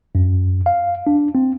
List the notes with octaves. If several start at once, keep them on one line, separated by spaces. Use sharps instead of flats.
F#2
F5
D4
C4